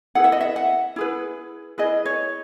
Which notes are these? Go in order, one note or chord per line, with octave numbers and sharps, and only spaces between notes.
E4 G#4 B4 F#5
E5
D#5
E5
F#5
E4 G#4 B4
E4 G#4 B4 D#5
C#5